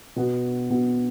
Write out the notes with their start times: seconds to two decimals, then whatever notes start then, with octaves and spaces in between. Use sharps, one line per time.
0.16 B2 B3 F#4
0.70 B2 B3 F#4